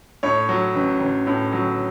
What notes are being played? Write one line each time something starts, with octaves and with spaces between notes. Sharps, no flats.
A2 C#5
F#3
A1
A1
A2
F#3